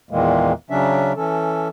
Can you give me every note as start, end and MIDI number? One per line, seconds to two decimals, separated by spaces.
0.11 0.53 40
0.11 0.53 46
0.11 0.53 51
0.11 0.53 52
0.11 0.53 56
0.11 0.53 58
0.70 1.13 49
0.70 1.13 54
0.70 1.13 61
0.70 1.13 62
0.70 1.13 76
1.17 1.68 52
1.17 1.68 61
1.17 1.68 69